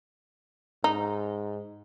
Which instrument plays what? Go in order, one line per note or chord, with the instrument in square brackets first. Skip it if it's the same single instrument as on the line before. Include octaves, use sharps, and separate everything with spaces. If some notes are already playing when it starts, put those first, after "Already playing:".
[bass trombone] G#2 [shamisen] D#4